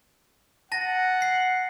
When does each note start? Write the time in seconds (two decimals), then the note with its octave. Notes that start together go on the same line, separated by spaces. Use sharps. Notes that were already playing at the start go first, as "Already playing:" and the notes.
0.72 F#5 A5 A6 A#6
1.21 C7 C#7